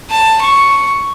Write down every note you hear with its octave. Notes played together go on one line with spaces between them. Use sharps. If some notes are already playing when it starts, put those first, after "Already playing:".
A5
C#6